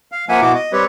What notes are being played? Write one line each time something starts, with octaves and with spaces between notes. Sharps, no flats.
F5
F3 A#3 E5 F#5 G#5
B2 B3 E4 F#4 D6
D#5
G3 C4 G4 B4 C#5